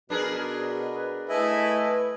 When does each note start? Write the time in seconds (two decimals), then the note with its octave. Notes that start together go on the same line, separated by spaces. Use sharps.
0.10 B2 D4 G#4 A#4 B4
1.29 A3 E4 B4 D#5 G#5